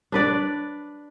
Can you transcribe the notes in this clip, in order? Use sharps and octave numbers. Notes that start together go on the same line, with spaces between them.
D4 B4 D5